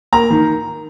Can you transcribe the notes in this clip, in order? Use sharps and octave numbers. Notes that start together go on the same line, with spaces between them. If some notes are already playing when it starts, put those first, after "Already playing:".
A#3 A#5
D#3